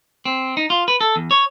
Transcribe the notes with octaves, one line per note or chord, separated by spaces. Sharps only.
C4
D#4
F4
B4
A4
E2
C#5